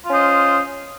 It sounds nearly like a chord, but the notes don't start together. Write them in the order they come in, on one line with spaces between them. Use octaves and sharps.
F4 C#4 C5 D#5